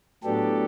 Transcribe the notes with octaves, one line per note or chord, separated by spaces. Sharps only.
A2 F#3 B3 D4 G4 A4